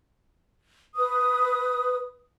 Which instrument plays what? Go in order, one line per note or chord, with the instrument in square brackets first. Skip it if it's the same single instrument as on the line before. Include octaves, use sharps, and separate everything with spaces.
[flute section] B4 D#6